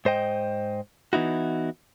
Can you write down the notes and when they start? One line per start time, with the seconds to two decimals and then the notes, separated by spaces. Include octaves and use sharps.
0.05 G#2 C5 D#5 G5
1.13 E3 B3 D#4 E4 F#4